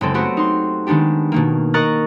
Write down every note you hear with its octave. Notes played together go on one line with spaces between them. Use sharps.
F#1 C#3 G#3 C4 A4
A3 B3 C4 F#4 G4
D#4 C6
D#3 G#3 B3 D4 G4
B2 D#3 A#3
A#4 D#5 A#5 C#6 F#6 A6